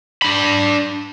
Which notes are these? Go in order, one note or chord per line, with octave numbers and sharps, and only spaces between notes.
D4 B5